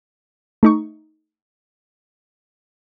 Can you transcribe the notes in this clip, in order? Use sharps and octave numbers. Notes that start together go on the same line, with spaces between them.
A3 D#4 C#6